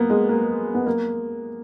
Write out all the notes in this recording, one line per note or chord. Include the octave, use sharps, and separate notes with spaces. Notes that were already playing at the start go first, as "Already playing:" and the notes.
Already playing: A#3 B3
G#3
A#3
B3
A#3